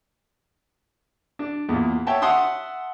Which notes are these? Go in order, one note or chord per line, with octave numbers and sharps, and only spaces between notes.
D4
E2 A#2
C#5 E5 G5 A5
E5 F#5 A5 C6 D#6 E6